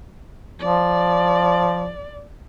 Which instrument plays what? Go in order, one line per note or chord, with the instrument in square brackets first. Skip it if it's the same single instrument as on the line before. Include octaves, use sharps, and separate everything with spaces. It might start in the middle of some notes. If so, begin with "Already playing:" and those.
[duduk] F3 [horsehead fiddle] D5